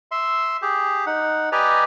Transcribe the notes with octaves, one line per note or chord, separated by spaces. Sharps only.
E5 C6
G4 G#4
D#4 F#5
G4 B4 D5 D#5 G#5 A#5